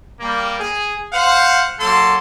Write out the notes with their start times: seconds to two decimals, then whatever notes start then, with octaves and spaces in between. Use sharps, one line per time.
0.20 G3 A#3
0.59 G#4
1.12 C5 F5 F#5
1.79 F#3 A#3 A4 C6